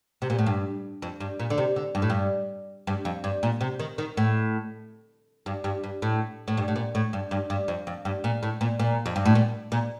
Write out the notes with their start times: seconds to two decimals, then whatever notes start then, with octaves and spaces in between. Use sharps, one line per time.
0.22 C3
0.30 A#2
0.39 A2
0.46 G2
1.02 F2
1.20 G2
1.40 A#2
1.50 D3
1.58 C3
1.76 D3
1.95 G2
2.02 A2
2.10 G2
2.87 G2
3.05 F2
3.24 G2
3.43 A#2
3.61 C3
3.79 D#3
3.98 D#3
4.17 A2
5.46 G2
5.64 G2
5.84 G2
6.02 A2
6.48 A2
6.57 G2
6.68 A2
6.76 A#2
6.95 A2
7.13 G2
7.31 G2
7.50 G2
7.68 F2
7.87 F2
8.05 G2
8.24 A#2
8.43 A2
8.61 A#2
8.79 A#2
9.06 F2
9.16 G2
9.26 A2
9.35 A#2
9.72 A#2